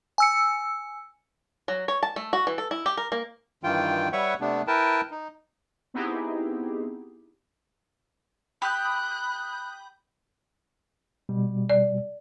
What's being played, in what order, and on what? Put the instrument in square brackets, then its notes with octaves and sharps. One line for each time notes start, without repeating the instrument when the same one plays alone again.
[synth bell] G#5 E6 C#7
[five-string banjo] F#3
C#5
A5
A3
F#4
E3
A4
E4
G4
A#4
A#3
[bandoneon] G2 D#3 E3 F4 G5
G3 B4 C#5 E5 F#5 C#6
C3 A3 B3 D4
E4 A#4 B4 G5 A5
D#4
[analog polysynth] B3 C4 D#4 E4 G4 G#4
[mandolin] G4 [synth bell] B5 D#6 G6 [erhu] F#6
[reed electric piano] B2 G3
[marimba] D5